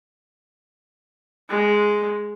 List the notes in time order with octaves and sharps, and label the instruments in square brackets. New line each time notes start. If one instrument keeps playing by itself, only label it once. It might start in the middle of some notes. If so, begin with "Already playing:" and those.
[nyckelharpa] G#3